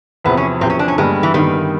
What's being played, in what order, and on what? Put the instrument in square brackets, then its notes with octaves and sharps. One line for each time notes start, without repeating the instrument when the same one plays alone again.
[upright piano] E2 C3 F3 [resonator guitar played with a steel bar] B3
[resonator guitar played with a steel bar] C#4
[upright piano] E2 C3 F3 [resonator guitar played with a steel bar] C4
[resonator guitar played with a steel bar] C#4
D4
C#4
[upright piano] G2 D3 G3 B3 [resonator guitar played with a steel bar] G#3
[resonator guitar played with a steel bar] E3
[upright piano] G2 D3 G3 B3 [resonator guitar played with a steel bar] D#3